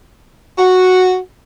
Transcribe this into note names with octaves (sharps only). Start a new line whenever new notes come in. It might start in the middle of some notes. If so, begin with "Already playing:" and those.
F#4